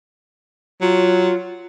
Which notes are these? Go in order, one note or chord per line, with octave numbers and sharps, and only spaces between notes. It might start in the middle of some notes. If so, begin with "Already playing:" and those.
F#3 F4